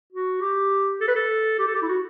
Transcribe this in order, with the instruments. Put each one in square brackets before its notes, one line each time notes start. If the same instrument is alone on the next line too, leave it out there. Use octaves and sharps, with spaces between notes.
[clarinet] F#4
G4
A4
B4
A4
G4
A4
G4
E4
F#4